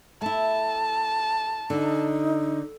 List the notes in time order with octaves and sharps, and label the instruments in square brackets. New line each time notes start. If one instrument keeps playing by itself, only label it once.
[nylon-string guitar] A3 E4 [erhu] A5
[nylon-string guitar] D3 [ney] D#4